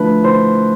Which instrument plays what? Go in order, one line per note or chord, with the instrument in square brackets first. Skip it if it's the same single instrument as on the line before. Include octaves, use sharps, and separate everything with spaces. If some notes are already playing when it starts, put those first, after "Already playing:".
Already playing: [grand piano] D3 F3 A3 B4
D3 C5